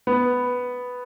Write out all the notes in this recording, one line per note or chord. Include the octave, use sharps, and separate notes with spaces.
B3